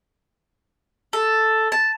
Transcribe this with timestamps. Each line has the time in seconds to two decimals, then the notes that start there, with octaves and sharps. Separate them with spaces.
1.13 A4
1.72 A5